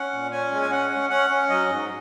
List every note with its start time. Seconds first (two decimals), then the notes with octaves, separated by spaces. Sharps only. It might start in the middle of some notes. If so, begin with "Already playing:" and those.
Already playing: C#4 F#5
0.12 A#2
0.31 C#4 G#5
0.51 G#3
0.62 G#5
0.70 C#4 F#5
0.91 C#4
1.10 C#4 F#5
1.30 C#4
1.49 F#3 D#5
1.68 G#2